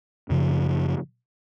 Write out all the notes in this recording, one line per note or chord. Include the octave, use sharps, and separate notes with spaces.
F#2 C#3 F3